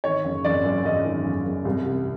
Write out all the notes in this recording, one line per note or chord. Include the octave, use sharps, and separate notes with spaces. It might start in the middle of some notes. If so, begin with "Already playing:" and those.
D#3 C#5
F#1
F#1 D5
F#2
F#1 D#5
D#3
F#1
F#1
C2
C3